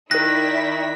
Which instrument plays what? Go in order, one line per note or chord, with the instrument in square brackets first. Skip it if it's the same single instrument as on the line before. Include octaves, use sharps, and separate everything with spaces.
[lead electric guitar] D#3 [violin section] E4 D5 B6 [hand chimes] A#4 F#6 [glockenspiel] A#6